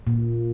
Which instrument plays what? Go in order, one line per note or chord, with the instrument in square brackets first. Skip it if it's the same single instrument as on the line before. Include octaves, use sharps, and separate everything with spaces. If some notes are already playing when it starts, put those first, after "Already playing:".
[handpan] A#2